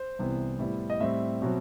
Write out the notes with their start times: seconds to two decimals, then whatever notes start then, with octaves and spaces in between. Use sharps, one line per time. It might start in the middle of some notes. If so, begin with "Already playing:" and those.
Already playing: C5
0.19 C2 C3 E3 B3
0.59 A2 G3 B3 E4
0.90 D#5
1.01 A2 G3 C4 E5
1.42 B2 F#3 C4